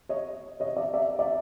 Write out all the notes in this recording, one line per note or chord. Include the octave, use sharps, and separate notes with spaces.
C#5 D#5
C#5 D#5
D5 E5
D5 E5
D5 E5